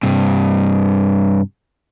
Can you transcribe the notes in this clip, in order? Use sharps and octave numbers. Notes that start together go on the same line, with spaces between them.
G2 C3